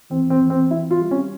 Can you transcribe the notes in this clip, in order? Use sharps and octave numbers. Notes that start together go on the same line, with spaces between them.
E2 C4
C4
E2
C4
E3 E4
F4
G3
C#4